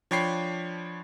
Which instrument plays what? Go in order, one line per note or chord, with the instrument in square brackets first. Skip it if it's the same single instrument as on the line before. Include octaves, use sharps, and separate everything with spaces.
[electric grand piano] F3 D4 C#5 G5 B5 C7